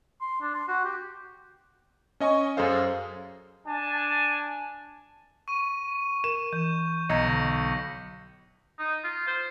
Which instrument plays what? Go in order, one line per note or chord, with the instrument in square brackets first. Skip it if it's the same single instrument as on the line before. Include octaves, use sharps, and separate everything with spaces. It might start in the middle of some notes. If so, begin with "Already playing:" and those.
[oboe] C6
D4
C6
F#4
G4
[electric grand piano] C#4 D#5 G#5 C#6
F#2 G#4 A4 C5 F5
[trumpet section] D4 G#5 A5
[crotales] C#6 D#7
[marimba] A#4 [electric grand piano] E7
[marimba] E3 [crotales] G6
[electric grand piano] B1 [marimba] D#5 A#5 G#6 [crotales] A#6 C#7
[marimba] D3
[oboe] D#4
F4
C5